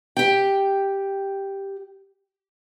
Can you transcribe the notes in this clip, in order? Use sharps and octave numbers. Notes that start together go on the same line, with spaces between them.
G4 G5